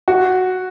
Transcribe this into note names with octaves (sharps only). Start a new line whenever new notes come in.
F#4